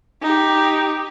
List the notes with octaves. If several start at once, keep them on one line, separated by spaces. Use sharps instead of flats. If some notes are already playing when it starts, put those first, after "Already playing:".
D#4 G4